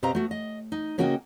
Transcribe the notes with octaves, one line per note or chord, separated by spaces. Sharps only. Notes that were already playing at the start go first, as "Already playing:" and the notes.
B2 C4 G4 D#5 F5 A#5
A3 F#4
D#5
D#4
C#3 A#3 C#4 F#4 D#5 G5